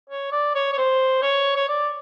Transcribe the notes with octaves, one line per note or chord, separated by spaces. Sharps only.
C#5
D5
C#5
C#5
C5
C#5
C#5
D5